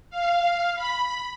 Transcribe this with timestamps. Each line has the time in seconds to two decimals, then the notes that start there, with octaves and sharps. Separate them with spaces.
0.10 F5
0.76 B5